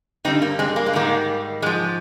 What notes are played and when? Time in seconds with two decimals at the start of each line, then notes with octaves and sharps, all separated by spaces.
0.25 G2 D3 G3 C4 D#4
0.42 A#3
0.59 G#3 C4
0.76 A#3
0.86 G#3
0.93 G#2 D#3 G3 A#3
1.62 G#2 G#3
1.66 F3